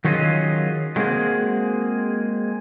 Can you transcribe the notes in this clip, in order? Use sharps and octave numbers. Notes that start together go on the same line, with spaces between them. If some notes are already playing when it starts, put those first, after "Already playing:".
D#3 F#3 C#4 F4 G#4 D#5
F#3 G#3 A#3 C4 F#4 G#4